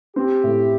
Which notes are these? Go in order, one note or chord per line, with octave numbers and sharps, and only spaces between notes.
C4 G4
A2